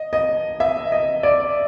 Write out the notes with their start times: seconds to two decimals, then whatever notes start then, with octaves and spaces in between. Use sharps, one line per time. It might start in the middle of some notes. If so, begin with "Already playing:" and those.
Already playing: D#5
0.13 D#5
0.60 E5
0.92 D#5
1.23 D5